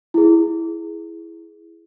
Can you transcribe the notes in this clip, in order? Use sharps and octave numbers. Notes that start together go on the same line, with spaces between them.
E4 G#4